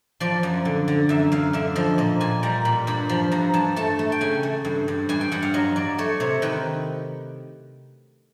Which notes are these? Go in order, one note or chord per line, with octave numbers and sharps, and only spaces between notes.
F3 D5
F#2
D3
D3
F#2 E5
F#2 F5
D3 E5
F3 D#5
A#2 D#5
A#2 G#5
G3 A#5
A#2 B5
G2 B5
F3 B5
G2 A#5
G2 A5
A3 A5
A3
G5
C#3 G#5
A3
G2
G2
G2 G#5
G5
G2 F#5
F5
F#3 D#5
F#3 D5
A3 C#5
C3 C#5
D#3 B4